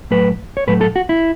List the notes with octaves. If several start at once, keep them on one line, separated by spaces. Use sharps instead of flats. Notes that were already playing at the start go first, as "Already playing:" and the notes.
A2 F#3 A3 B4
C#5
A2 F#3 A3 B4
A4
F#4
E4